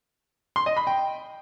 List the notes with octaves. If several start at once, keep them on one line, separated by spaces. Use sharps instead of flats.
C6
D#5
B5
G5